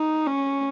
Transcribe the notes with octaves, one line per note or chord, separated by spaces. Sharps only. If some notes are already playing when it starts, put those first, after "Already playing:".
Already playing: D#4
C#4